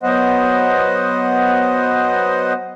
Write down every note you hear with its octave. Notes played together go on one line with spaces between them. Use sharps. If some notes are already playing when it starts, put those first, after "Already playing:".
F#3 B3 C5 D#5 F#5